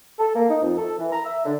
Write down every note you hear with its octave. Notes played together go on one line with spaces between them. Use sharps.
A4
A#3
D#4
F2
A4
E3
A#5
E5
D3